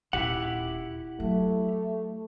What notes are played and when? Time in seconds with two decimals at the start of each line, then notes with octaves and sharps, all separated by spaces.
0.13 D#1 E4 G4 F#5
1.20 F#3 A3